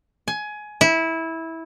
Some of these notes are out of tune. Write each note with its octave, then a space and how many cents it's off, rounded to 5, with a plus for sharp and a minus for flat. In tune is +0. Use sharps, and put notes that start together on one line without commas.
G#5 +20
E4 -15